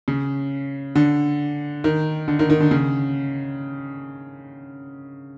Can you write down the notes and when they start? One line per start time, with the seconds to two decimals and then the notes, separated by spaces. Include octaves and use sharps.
0.08 C#3
0.95 D3
1.84 D#3
2.28 D3
2.39 D#3
2.50 D#3
2.60 D3
2.71 C#3